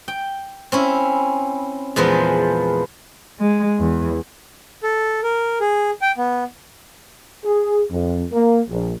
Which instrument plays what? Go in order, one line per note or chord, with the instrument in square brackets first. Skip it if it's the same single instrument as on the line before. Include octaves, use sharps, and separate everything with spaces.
[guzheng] G5
C4 C#4 E4
E2 A#2 F3 G#3 B3 C5
[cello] G#3
E2
[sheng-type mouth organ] A4
A#4
G#4
G5
B3
[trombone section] G#4
F2
A#3
A#1